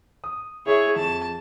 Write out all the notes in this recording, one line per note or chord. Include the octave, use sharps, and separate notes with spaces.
D#6
E4 G#4 C#5 E5
F2 A5